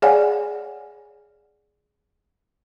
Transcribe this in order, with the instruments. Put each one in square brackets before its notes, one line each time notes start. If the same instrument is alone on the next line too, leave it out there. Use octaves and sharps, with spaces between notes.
[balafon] G#4 C#5 D5 F5 F#5 G#5